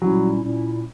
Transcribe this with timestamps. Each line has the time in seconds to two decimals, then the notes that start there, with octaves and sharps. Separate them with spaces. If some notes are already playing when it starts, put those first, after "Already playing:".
0.01 A#2 F#3 G3 C#4 E4
0.42 A#2 G3 C#4 E4